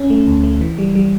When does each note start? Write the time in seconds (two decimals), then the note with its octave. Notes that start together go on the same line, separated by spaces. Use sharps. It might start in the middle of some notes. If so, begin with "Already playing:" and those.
Already playing: C#4
0.10 A3
0.27 D2
0.43 A3
0.61 E3
0.78 G3
0.95 G3